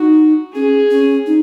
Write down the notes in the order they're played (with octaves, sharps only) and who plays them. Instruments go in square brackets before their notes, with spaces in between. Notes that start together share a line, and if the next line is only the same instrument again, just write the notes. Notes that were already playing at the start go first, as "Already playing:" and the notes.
Already playing: [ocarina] D#4 [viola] F#4
[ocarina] C#4 [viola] G#4
[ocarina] C#4
D#4